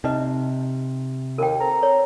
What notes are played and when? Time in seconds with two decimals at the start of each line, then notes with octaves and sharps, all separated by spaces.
0.04 C3 D#4 B4 D#5
1.38 D#2 A#4 G5
1.60 C4 A4 A#5
1.83 C#5